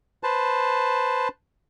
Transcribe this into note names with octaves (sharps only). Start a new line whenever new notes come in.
B4 C5 A5